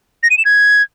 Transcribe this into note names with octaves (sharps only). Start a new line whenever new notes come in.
A#6
D#7
E7
G#6